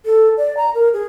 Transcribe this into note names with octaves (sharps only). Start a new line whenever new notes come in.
A4
D5
A#5
A#4
G#4